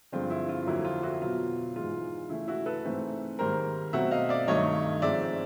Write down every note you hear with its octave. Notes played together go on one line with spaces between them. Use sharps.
G2 D3 F3 G#3 C4 F4
E4
F4
F2 D3 F#3 A#3 E4
F4
E4 F#4
B2 F#3 B3 F4
G#2 E3 G#3 F4
C#3 E3 A3 E4
E4 F#4
A4 B4
G#2 E3 A3 C4
G#2 D#3 G3 A#3 A#4 C5
B2 F#3 A3 C4 E5 F#5
D#5 F5
D5 E5
G2 D#3 F#3 A3 C#5 D#5
G#2 F3 G#3 C4 D5 E5